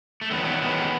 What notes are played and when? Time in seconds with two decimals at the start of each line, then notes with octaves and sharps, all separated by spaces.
0.21 A3
0.31 E2 D#3 F#3 B3
0.46 B3
0.61 E2 D#3 F#3 B3